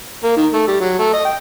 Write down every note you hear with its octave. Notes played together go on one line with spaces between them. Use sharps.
A#3
D#3
A3
G3
F#3
A3
D#5
G5